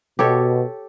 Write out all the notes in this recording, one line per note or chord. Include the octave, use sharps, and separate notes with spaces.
B2 G4 A4 C#5